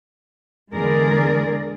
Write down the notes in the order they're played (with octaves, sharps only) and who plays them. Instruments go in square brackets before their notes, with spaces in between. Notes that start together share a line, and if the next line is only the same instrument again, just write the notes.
[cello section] E2 D3 G#3 G#4 A#4 D5